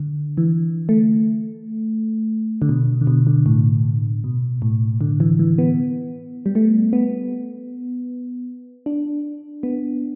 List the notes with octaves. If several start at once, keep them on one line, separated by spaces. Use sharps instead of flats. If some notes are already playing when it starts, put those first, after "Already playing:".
Already playing: D3
E3
A3
D3
B2
D3
B2
D3
A2
B2
A2
D3
E3
E3
B3
G3
A3
B3
D4
B3